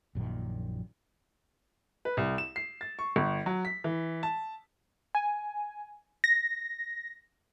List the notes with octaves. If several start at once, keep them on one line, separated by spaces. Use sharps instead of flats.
A#1 F#2 A#2 D#3
B4
C2
E7
C7
A6
C#6
G1
F#3
B6
E3
A5
G#5
A#6